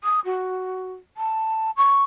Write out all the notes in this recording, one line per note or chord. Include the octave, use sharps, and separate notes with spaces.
D#6
F#4
A5
C#6